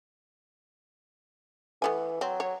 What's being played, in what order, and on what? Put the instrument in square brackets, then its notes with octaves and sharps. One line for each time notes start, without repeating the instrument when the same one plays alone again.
[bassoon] E3 [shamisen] A3 B3 G#5
[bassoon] F#3 [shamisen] C4
[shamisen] C#5